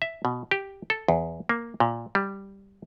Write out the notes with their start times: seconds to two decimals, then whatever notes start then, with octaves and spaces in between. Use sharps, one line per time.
0.02 E5
0.25 B2
0.51 G4
0.90 A4
1.08 E2
1.49 A#3
1.80 A#2
2.15 G3